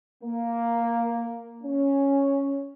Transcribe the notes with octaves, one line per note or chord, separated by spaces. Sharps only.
A#3
C#4